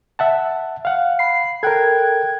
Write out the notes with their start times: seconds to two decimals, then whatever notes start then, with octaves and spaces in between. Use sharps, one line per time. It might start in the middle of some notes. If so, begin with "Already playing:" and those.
0.19 E5 F#5 A5
0.85 F5 F#5
1.19 B5 C7
1.63 A4 A#4 G5 F#6 G#6